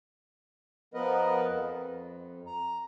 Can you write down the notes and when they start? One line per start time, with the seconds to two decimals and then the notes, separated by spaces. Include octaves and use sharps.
0.94 F3 B3 A#4 B4 D#5
1.48 F2
2.47 A#5